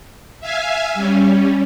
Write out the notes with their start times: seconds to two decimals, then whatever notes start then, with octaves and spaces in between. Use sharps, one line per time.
0.40 E5 F5 G#5
0.94 G3 C#4